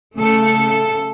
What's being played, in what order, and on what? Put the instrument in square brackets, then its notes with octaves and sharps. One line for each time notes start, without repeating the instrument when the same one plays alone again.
[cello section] C#3 A3 A4